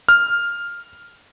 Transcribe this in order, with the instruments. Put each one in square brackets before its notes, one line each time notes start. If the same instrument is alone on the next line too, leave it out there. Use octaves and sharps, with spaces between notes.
[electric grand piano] F6